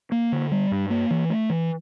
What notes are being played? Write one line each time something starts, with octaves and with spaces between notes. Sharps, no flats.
A#3
D3
G3
G2
A#3
E3
A3
E3